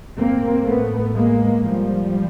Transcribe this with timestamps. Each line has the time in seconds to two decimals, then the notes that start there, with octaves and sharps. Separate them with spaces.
0.17 A2 A#3 C4
0.65 A3 B3
1.15 G#3 A#3
1.63 F3 G3